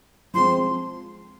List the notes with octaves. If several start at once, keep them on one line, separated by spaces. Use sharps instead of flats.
F3 G#3 C4 C6